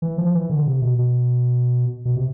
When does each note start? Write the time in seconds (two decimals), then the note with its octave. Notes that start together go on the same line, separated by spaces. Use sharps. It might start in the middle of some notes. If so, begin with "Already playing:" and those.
0.02 E3
0.18 F3
0.35 E3
0.50 D3
0.66 C3
0.82 B2
0.99 B2
2.05 B2
2.17 C3